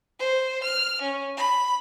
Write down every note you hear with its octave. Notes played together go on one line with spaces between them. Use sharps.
C5
F6
C#4
B5